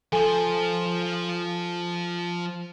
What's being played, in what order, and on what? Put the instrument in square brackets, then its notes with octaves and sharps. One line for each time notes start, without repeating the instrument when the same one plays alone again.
[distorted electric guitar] F3 C5 [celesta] A4 G#5